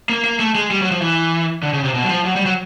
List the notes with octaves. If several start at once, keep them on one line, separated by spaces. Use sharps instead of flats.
A#3
A#3
A3
G#3
G3
F#3
F3
E3
D3
C#3
C3
B2
F#3
F3
F#3
G3
F#3